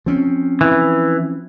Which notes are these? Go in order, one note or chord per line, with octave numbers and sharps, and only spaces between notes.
F3 C4 C#4
E3